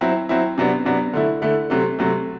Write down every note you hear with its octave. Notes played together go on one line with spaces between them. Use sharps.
F#3 C4 E4
F#3 C4 E4
C3 F#3 B3 D4
C3 F#3 B3 D4
D3 A3 E4
D3 A3 E4
C3 F#3 A3
C3 F#3 A3